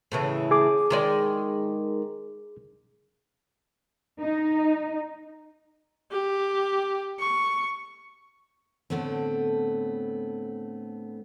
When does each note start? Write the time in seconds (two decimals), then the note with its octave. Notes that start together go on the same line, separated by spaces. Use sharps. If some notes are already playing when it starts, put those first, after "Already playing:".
0.12 A2 C#3 E3
0.51 G#4 D6
0.90 D#3 G#3 D5
4.20 D#4
6.11 G4
7.19 C#6
8.90 A2 D3 A3 B3 C4